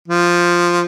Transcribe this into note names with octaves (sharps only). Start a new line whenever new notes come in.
F3